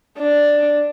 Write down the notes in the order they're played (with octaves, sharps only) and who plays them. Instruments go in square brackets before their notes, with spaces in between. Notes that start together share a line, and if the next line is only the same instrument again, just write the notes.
[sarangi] D4